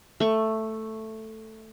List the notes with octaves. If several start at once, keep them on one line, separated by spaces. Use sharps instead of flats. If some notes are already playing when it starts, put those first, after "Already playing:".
A3 C#6